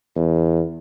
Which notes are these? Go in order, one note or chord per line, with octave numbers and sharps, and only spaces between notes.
E2